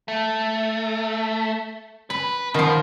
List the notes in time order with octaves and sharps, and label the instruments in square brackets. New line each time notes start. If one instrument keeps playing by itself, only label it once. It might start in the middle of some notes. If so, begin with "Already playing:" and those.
[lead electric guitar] A3
[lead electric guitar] B4 [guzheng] B5
[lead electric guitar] B2 [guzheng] D#3 F3